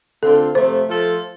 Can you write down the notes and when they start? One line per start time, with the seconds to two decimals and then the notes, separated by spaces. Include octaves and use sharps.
0.23 D3 A3 C4 F4 A4
0.55 C3 F3 A3 C5
0.89 F3 A3 F4 A4